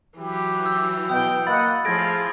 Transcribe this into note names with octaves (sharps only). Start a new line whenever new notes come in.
E3 F#3 G4
E6 G6
B2 G5 D#6
A#3 D#5 F#5 B5 A6
A2 F3 F4 G#4 G#6 A#6 D7